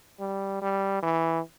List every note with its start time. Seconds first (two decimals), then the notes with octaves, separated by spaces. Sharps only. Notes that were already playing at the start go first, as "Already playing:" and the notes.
0.20 G3
0.62 G3
1.02 E3